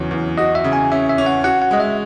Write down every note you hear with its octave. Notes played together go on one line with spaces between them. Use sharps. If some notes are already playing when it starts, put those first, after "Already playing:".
Already playing: E2 C#3 F#3 C#5
E2
F#4 D#5
E5
C#3
G#5
C#4 E5
E5
C#4
F#5
F#4 F#5
F#5
G#3 D#5
E5